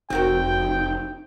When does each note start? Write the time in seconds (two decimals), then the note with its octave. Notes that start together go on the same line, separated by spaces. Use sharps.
0.10 F1 C4 D#4 F#4 A#4 G5